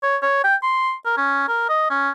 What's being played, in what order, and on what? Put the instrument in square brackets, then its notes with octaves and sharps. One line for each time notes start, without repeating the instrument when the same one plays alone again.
[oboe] C#5
C#5
G5
C6
A#4
C#4
A#4
D#5
C#4